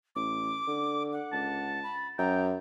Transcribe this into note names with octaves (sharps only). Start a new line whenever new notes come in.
A1 D6
D3
F#5
C#2 A5
B5
F#2 G5 A#5